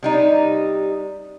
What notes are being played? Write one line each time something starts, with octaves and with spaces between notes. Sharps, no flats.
C3 G3 D#4